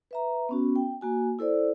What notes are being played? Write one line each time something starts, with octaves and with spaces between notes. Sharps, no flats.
B4 E5 A#5
B3 C#4 F#4
G5
A#3 F#4 G#5
E4 A4 C5 D5